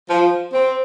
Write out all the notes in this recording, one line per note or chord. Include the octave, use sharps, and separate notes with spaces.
F3
C4